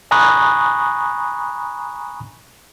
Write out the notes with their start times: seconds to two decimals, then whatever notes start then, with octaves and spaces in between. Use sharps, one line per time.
0.11 G#5 A#5 B5 C#6 D#6 F#6